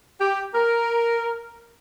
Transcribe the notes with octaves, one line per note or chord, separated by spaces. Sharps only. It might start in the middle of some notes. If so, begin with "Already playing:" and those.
G4
A#4